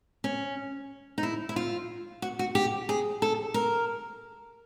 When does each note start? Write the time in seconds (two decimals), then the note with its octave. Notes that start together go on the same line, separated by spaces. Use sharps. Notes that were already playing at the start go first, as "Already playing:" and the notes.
0.24 C#4
1.18 D#4
1.23 E4
1.49 E4
1.56 F4
2.22 F#4
2.39 F#4
2.55 G4
2.89 G#4
3.22 A4
3.54 A#4